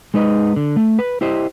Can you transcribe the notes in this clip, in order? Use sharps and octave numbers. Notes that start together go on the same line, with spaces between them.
G#3 D#4 B4 D#5
D3
A3
B4
E4 G4 C5 D#5